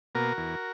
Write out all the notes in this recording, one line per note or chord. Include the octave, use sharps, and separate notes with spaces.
B2 A#3 F#4 A#4
E2